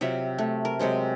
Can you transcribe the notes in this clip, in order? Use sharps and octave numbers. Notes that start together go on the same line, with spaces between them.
C3 F#3 F4 E5
A3
A#4
C3 F#3 G#3 C5